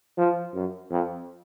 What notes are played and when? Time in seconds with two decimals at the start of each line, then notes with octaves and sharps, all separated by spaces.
0.18 F3
0.54 F#2
0.91 F2